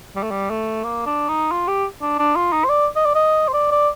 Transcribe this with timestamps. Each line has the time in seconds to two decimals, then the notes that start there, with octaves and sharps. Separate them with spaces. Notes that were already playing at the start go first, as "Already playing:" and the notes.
0.16 G3
0.23 A3
0.31 G3
0.50 A3
0.84 A#3
1.06 D4
1.29 D#4
1.51 F4
1.68 G4
2.01 D4
2.19 D4
2.36 F4
2.53 D#4
2.64 C5
2.69 D5
2.96 D#5
3.05 D5
3.15 D#5
3.48 C5
3.54 D5
3.71 D5